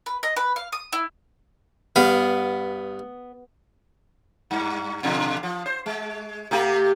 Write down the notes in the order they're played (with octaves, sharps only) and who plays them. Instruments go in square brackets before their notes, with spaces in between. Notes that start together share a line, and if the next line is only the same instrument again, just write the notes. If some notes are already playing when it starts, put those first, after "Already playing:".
[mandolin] B4
D#5
B4
F5
D#6
E4
[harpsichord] G2 F5 [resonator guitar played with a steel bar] B3
[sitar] G2
B2 D3 F3
F3
C5
G#3
C3 A3 G4